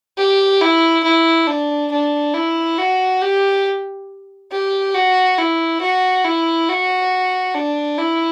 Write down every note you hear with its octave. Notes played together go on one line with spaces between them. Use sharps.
G4
E4
E4
D4
D4
E4
F#4
G4
G4
F#4
E4
F#4
E4
F#4
D4
E4